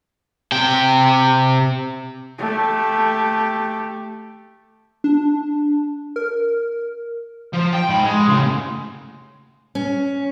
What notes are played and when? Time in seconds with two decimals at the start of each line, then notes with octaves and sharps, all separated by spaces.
0.52 C3 G5
2.39 A3 G4
5.04 D4
6.16 A#4
7.53 F3
7.73 G5
7.89 G#2 B5
8.03 G#3
8.28 A2 C#3
9.75 C#4